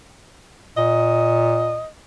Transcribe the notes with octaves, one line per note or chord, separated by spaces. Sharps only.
A#2 D#5